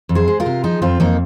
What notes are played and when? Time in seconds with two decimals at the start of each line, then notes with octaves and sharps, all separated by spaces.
0.09 F2
0.15 G#4 C5
0.28 G#3
0.40 F4 A#4
0.46 C3
0.64 F3 D#4 G#4
0.82 F2 C4 F4
1.00 F2 A#3 D#4